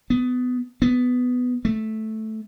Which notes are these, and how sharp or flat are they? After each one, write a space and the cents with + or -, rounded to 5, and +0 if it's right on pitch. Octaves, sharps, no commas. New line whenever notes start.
B3 +20
B3 +10
A3 -5